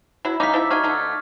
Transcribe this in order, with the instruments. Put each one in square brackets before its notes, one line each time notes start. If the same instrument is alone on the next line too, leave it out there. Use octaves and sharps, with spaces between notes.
[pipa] F#3 E4
[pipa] C#3 C#4 D#4 [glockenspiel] D6 B6
[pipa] F3 E4 E5
[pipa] D3 F#3 D#4 [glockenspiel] C#6 F6 G#6
[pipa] D3 A3 D#4